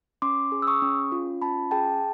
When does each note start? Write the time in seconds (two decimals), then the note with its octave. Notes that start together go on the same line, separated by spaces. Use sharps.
0.22 C#4 C6 D6
0.52 G#4
0.62 E6
0.67 C#6 D#6
0.82 C#4
1.12 F4
1.42 C#4 A5 B5
1.71 G#4 G5 A5